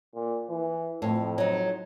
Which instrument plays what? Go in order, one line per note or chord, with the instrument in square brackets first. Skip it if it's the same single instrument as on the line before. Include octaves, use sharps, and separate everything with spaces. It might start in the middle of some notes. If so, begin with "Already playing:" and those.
[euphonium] A#2
E3
[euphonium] F2 [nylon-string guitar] A2
[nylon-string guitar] F#3 D#4